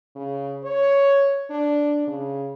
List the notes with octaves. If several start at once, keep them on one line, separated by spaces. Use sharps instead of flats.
C#3
C#5
D4
C#3